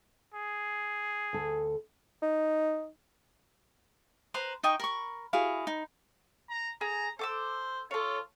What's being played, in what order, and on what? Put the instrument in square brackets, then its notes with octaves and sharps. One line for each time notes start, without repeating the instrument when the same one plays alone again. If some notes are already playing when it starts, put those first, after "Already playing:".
[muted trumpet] G#4
[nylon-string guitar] D2 A4
[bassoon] D#4
[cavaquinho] B4 C5 A#5
D#4 D#5 G5 C#6
A#4 B5 C#6
E4 F#4 G#4 F5
D#4
[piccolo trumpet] A#5
[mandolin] G#4 [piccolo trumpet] A#5
[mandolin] A4 D6 E6 [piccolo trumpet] C5
[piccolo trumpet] F4 [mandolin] A4 C#5